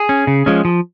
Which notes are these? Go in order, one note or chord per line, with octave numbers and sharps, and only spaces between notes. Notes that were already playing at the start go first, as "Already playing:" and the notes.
Already playing: G#4
C#4
C#3
F3 G#3 C#4
F3